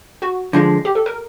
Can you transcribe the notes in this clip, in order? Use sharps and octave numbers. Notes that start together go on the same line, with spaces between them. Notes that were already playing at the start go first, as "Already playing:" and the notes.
F#4
D3 F3 G#3
G4
A4
A#4